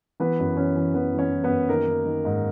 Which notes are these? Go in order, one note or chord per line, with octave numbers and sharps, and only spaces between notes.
E3 B3 B4
F#2
E3 C#4 C#5
E3
E3 B3 B4
E3
C#4 C#5
E3
B3 B4
F#2
D#3 A#3 A#4
D#3
D#3
G#2